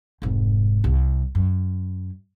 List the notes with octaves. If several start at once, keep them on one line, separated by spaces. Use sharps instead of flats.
F1 G#2
C2
F#2